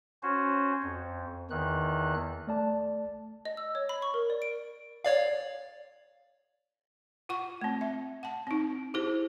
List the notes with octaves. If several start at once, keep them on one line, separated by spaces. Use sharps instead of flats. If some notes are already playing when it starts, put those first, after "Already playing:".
C#4 F#4 C5
F2
E2 D#3 F#6
A3 D5 A5
D#5
E6
C#5
B5
C#6
A#4
D5
D7
C#5 D5 F5
F4 F#5 C#6
A3 C4
E5
F#5 A5
C4 D#4
E4 G4 G#4 C5